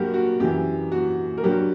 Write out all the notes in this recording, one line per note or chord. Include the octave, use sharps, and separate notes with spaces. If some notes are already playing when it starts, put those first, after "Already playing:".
Already playing: G2 F#3 F#4 G4 A#4
F#4
F#2 E3 G4
F#4
A#4
G2 F#3 G4